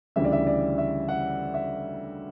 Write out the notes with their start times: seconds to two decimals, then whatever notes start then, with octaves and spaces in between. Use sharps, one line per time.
0.16 D2 C#3 E3 G3 E5
0.24 D5
0.32 E5
0.47 D5
0.78 E5
1.08 F#5
1.54 E5